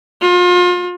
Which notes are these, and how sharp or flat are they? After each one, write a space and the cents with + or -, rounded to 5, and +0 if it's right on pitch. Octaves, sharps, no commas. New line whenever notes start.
F4 +35